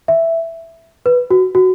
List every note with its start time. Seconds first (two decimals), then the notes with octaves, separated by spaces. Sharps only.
0.08 E5
1.06 B4
1.31 F#4
1.55 F#4